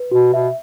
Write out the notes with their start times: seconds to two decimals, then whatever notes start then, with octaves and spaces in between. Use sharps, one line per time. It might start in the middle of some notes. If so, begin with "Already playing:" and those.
Already playing: B4
0.12 B2 F#4
0.34 B2 E5